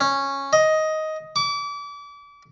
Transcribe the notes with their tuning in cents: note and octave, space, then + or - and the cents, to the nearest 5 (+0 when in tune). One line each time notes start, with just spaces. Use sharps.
C#4 -10
D#5 +10
D6 -35